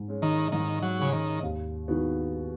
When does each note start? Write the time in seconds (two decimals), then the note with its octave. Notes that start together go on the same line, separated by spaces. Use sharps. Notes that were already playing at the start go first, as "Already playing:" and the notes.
Already playing: G#2
0.08 G#3 C#4
0.22 D#3
0.52 G#2 D#3
0.82 F#3
0.98 C#3 G#3 C#4
1.13 D#3
1.42 D#2
1.88 D#3 G#3 B3 F#4